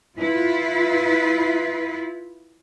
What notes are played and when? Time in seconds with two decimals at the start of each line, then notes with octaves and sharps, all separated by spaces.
0.18 E4 F4 B4